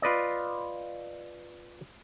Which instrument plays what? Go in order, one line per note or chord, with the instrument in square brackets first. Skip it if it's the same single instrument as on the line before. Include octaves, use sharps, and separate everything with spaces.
[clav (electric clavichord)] F4 B4 D5 D#5